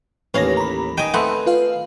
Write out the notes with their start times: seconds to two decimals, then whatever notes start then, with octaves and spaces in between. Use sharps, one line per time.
0.34 A1 D#2 C#4 B4 C#5 F5 A#6
0.57 A#5 B5
0.97 D#3 D#5 G5 G#5
1.14 A3 B3 C4 F#5
1.46 F4 B4 F5